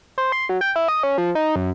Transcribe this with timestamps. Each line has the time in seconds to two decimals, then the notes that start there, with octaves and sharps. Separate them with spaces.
0.18 C5
0.32 C6
0.49 F#3
0.61 G5
0.76 E4
0.88 D#5
1.03 C#4
1.18 F3
1.35 D#4
1.56 F#2